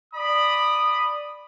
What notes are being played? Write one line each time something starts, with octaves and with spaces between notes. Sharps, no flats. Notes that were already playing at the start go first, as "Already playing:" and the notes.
D5 B5 D#6